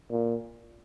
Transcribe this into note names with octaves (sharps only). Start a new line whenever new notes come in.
A#2